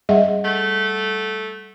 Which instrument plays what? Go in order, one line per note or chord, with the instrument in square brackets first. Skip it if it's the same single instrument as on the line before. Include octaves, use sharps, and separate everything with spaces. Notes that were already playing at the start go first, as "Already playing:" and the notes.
[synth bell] G3 F#5 [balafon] G#4 D#5 E5
[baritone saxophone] A3